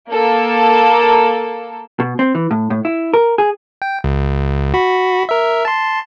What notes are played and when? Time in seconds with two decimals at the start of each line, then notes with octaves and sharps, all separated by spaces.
0.10 A#3 A4
2.00 B2
2.19 C4
2.35 E3
2.51 A2
2.70 A2
2.85 E4
3.14 A#4
3.38 G#4
3.82 G5
4.04 C#2
4.74 F#4 B5
5.29 A#4 E5
5.65 A5 C6